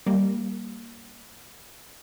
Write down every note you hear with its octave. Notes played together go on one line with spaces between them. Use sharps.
G3 A#3